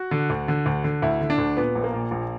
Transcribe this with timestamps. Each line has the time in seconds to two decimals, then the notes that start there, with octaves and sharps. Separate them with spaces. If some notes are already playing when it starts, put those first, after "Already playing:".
Already playing: F#4
0.11 D3
0.30 D2
0.48 D3
0.66 D2
0.84 D3
1.02 D2 E4
1.21 D3
1.30 D4
1.38 D2
1.57 A#2 B3
1.75 A#1
1.84 A#3
1.93 A#2
2.11 A#1